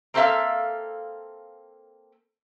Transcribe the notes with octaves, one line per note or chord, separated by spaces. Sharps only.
A#3 C4 A4 C#5 E5 F5